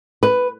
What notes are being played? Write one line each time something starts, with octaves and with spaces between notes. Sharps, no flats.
B4